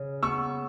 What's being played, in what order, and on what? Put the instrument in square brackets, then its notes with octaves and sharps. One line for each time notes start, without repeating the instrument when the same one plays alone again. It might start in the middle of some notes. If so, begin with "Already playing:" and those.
Already playing: [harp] C#3
[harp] B3 [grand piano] C#6 E6